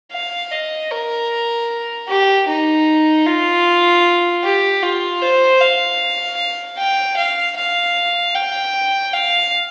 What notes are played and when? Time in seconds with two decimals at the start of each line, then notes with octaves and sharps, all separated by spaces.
0.12 F5
0.52 D#5
0.91 A#4
2.08 G4
2.48 D#4
3.26 F4
4.44 G4
4.83 F4
5.22 C5
5.61 F5
6.78 G5
7.17 F5
7.56 F5
8.34 G5
9.13 F5